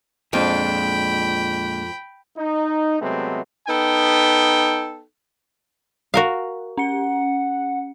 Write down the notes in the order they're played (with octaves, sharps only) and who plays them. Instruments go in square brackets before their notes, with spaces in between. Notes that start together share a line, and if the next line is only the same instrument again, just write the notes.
[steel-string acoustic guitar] F2 F5 [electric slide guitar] A#2 G#3 D4 [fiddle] G5 B5
[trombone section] D#4
C3 F#3 G#3 A3 B3 C4
[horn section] B3 D#4 A4 G5
[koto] F#4 A#4 F5
[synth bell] C#4 C#7 [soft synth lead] F#5